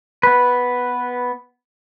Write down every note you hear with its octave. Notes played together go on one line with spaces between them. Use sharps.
B3 B4